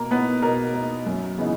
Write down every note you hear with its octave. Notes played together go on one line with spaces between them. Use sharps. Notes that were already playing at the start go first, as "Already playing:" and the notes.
Already playing: B2 A#3 A#4
A#3 B3 D#4 B4
B2 A#3 A#4
A#3 D#4
F#2
C#3 E3 B3 D#4